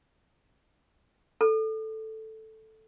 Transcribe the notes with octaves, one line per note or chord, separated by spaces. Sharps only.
A4